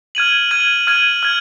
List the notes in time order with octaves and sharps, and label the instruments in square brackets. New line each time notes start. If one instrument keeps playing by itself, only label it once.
[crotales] F6 G#6 D#7 F#7
F6 G#6 D#7 F#7
F6 G#6 D#7 F#7
F6 G#6